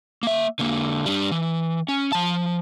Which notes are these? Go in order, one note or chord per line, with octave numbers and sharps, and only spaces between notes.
A#3 E5
D3 A#3
G3 D4
E3
C#4
F3 A5